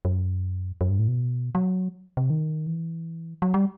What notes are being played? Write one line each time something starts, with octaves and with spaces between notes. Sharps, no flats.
F#2
F#2
G2
A2
B2
F#3
C3
D#3
E3
F#3
G3